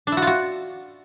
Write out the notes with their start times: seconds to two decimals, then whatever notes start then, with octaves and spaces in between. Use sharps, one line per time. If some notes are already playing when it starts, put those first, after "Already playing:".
0.07 D4
0.12 E4
0.17 F#4
0.22 F4
0.27 F#4